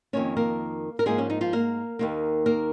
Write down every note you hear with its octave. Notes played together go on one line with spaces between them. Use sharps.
F2 D#3 A#3 C#4 C#5
A#3 A#4
A#4
G#2 F3 G#3 A#3 G#4
C#4
D#4
F3 F4
A#3 A#4
D#2 D#3 A#3
A#3 A#4